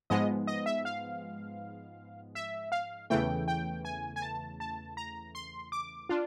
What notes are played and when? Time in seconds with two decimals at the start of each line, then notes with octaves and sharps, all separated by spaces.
0.10 G#2 F3 G#3 B3 D#5
0.47 D#5
0.66 E5
0.85 F5
2.35 E5
2.72 F5
3.10 E2 C#3 E3 A3 G5
3.48 G5
3.85 G#5
4.16 G#5
4.22 A5
4.60 A5
4.97 A#5
5.35 C6
5.72 D6
6.09 D4 F4